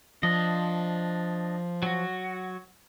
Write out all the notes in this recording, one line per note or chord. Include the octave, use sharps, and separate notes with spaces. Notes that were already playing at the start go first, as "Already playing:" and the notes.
F3 D4 D#5
F#3 F#4